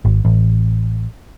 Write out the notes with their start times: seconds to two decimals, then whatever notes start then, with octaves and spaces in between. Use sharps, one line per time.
0.05 G#1
0.25 A1